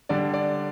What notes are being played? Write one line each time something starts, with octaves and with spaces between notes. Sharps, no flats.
D3 G3 D4 D5
D5